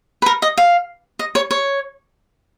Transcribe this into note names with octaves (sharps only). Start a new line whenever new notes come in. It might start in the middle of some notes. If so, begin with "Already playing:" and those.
B4
A#4
D#5
F5
D#5
C#5
C#5